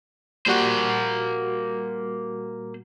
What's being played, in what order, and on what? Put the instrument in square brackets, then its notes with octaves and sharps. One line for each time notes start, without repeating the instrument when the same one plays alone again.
[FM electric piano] A#2 G3 F#4 [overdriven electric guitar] A#3 C5